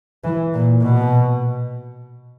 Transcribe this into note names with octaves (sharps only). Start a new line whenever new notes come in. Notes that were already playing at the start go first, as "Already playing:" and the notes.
E3
A#2
B2